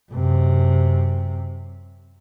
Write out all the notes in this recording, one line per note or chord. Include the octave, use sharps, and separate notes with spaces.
F#2 C3